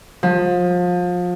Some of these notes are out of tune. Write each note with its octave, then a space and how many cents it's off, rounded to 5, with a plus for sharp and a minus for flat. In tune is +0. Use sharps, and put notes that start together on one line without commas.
F3 +30